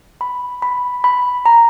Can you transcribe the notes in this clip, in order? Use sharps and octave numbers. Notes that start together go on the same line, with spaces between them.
B5
B5
B5
A#5